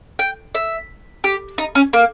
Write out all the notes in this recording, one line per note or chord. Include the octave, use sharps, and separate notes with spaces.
G5
E5
G4
D#4
C#4
A#3